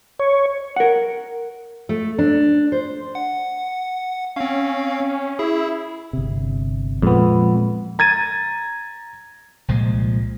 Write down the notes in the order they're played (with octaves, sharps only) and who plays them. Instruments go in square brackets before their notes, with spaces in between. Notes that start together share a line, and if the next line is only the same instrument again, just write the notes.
[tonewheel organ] C#5
[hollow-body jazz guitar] A#4 F#5
[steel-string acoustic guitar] A3
D4
C5
[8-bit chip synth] F#5
[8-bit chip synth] C4 F5 [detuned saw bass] C#4
[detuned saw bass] E4 [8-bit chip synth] G#4
[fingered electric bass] G1 C3
[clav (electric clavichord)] F2 B3 [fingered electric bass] A#2 G#3
[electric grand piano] A#5 G#6 A6 D#7
[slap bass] C2 A#2 F3 G#3